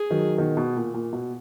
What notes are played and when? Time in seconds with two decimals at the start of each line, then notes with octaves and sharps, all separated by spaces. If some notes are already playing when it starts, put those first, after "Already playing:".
Already playing: G#4
0.10 D#3 F#3
0.38 B2 D#3
0.57 B2
0.76 A#2
0.94 A#2
1.13 B2